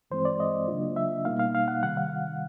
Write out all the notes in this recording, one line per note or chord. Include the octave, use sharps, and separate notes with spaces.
G2 E3 G#3 C4 C5
D5
D#5
C#3 F#3 A#3 D4 F4
E5
B2 G3 A#3 D#4 F5
F5
F5
F#5
C3 D#3 G3 F#5
F5